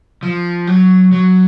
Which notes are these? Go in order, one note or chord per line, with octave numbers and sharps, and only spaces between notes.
F3
F#3
F#3